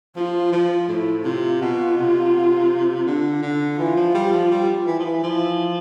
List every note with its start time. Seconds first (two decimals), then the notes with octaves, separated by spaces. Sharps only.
0.16 F3 F4
0.52 F3
0.88 A2 E4
1.25 C3 F4
1.60 B2 F4
1.97 C3
3.06 D3
3.42 D3
3.78 E3 F4
3.96 F3
4.14 G3
4.32 F3
4.51 G3
4.87 E3
4.99 F3
5.05 E3
5.22 F3 E4